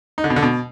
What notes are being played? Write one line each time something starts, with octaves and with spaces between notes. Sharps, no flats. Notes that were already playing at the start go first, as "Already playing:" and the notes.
D#4
D3
B2
D3
B2